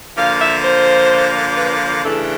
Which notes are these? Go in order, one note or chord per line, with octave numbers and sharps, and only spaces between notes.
D3 F3 A#3 F5
E5
C5
B4
C#3 E3 A3 D4 A4